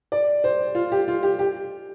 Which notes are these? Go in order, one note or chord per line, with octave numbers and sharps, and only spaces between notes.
D5
C5
F4
G4
F4
G4
G4